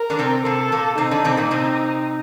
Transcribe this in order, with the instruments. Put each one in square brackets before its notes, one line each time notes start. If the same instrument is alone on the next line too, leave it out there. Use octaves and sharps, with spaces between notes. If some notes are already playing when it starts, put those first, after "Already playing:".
Already playing: [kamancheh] A#4
[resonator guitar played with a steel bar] D3 D4
C3 C4
[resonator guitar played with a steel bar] C3 C4 [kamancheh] A4
[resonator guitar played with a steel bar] A#2 A#3
[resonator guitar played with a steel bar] C3 C4 [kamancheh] D#4
[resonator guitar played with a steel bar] D3 D4
C3 C4
A#2 A#3
C3 C4